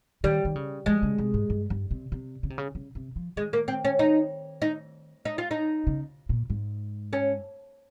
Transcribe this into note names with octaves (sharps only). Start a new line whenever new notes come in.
D#3 G3
D#3
C#3
F3 G#3
C#3
C3
G#2
G2
G2
C3
C3
C#3
C3
C#3
C#3
C3
F3
D#3 G#3
A#3
C4
C#4
D#4
D#4
D#4
F4
D#4
C#3
A#2
G#2
C#4